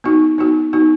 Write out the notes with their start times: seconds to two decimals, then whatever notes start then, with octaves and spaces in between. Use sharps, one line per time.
0.04 B3 D#4 F#4
0.38 B3 D#4 F#4
0.73 B3 D#4 F#4